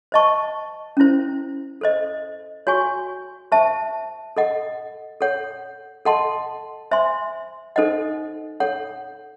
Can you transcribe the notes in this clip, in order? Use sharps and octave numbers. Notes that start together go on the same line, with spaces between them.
C5 D#5 A5 C#6
C#4 E4 C5
A4 C5 D#5
F#4 C#5 G#5 C#6
C5 E5 A5 C#6
A4 D#5 F#5
A4 C#5 F#5
A4 D#5 F#5 A5 C6
C5 E5 G#5 C6
D#4 A4 C5 D#5 F#5
A4 C#5 F#5